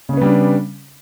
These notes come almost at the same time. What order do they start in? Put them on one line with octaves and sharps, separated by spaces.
C#3 C#4 B3 G3 D4